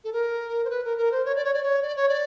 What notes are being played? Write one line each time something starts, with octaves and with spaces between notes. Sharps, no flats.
A4
A#4
C5
B4
A#4
A#4
C5
C#5
D5
C#5
D5
C#5
D5
C#5
D5